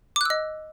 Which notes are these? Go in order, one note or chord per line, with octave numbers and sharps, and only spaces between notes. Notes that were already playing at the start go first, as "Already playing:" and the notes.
D#5 D6 E6 F#6